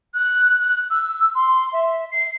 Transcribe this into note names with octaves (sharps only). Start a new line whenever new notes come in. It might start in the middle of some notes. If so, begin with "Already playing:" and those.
F#6
F#6
E6
C6
E5
C7